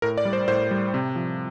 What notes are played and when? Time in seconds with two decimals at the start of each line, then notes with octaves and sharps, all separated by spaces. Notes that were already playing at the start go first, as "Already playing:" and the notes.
0.02 A2 A#4
0.18 D5
0.25 G3
0.33 C5
0.48 A2 C5
0.71 G3
0.94 C3
1.16 F3